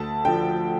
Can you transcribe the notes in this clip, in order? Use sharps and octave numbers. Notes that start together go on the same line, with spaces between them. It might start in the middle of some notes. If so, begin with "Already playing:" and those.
Already playing: D2 A5
D3 F3 G5